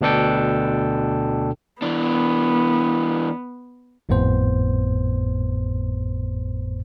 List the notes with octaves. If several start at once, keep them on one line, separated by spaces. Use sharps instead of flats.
D2 B2 D4 A4 G5
E3 B3 D4
G#1 F2 A2 B3 C5